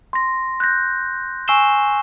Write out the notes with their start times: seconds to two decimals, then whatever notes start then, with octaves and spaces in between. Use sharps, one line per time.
0.13 C6 A#6
0.60 F#6 G6 A#6
1.48 G#5 C#6 E6 C7 E7 G7